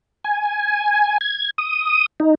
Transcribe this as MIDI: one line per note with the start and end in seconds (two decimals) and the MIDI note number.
0.24 1.18 80
1.21 1.50 92
1.58 2.06 87
2.20 2.35 63